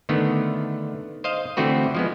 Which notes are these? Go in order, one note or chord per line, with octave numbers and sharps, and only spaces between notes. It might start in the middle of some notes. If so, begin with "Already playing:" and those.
D3 D#3 A3 B3
C5 D#5 F5
D3 E3 A3 C4 F#4 B4
F3 G#3 B3